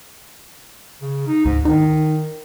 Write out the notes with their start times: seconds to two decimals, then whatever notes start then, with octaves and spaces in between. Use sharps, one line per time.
1.02 C#3
1.27 D#4
1.45 D2 G#2
1.65 D#3 D#4